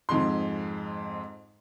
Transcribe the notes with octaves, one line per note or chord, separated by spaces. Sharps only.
F2 G#2 G#3 C6